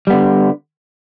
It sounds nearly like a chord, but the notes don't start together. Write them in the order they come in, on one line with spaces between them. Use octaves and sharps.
G3 B3 D3